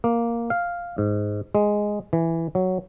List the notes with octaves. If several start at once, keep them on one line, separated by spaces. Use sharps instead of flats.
A#3
F5
G#2
G#3
E3
F#3